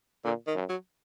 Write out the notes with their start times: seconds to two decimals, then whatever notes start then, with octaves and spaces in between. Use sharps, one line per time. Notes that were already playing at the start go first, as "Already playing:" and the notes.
0.24 A#2 D3
0.47 D#3
0.55 F#2
0.69 F#3